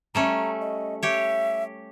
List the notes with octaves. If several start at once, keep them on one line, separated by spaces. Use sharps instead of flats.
G3 A3 C#4 A#5
D#5
G4 C#5 E5